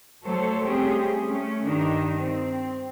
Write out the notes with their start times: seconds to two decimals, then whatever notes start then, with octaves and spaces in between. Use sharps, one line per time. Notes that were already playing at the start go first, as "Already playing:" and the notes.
0.24 F#3 A3 A4 C5 C#5
0.64 G3 A3 C4 C#4 G4 G#4
1.26 A3 C#4
1.65 G2 D#3 D4 D#4
2.18 C4